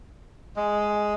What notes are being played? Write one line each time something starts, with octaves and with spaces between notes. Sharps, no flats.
G#3